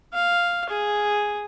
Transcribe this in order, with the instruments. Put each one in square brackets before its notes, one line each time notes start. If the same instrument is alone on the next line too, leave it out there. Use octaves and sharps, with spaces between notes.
[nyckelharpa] F5
G#4